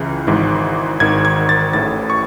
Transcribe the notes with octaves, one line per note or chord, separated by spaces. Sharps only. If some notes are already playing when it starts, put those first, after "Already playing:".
Already playing: C#2 C#3 E3
G#1 G#2 E3
G#1 G#2 D#3 G#6
G#6
A6
A1 A2 E3 A6
C#6